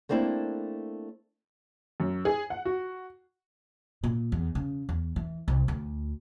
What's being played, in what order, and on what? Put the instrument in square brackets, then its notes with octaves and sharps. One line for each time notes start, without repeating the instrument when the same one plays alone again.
[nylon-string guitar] A3 A#3 C4 D4 E4
[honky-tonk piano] F#2
G#4
F#5
F#4
[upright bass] A#2
E2
C#3
E2
E3
C2
D2